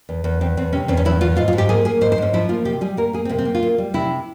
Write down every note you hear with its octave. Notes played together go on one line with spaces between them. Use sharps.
E2
E2
E2 C4
E2 C4
C3 C#4
E2 C4
C#4
E2 E4
E2 F4
G#2 F4
F4
G#2
G4
A#3 G#4
A#3 G#4
G#2 C5
C5
G#2 C#4
F3 E4
A#3 F4
C3 G4
G3 G#4
A#3 A#4
A#3 G#4
C4
C3 A#3
C4
A#3
F4
A#3
G3
C3 E4